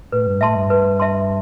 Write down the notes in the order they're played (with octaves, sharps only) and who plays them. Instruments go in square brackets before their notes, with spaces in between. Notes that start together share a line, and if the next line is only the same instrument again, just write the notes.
[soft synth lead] A2 [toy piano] B4
[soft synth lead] G2
[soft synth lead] A2 [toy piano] E5 A5 C6
[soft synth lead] G2
[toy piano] B4
E5 A5 C6